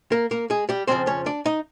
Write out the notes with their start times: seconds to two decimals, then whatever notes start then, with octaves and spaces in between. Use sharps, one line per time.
0.12 A#3 A#4
0.31 A#3 A#4
0.50 G#3 G#4
0.69 G3 G4
0.87 F2 C#3 F3 C4 C5
1.07 C#4 C#5
1.26 D4 D5
1.46 D#4 D#5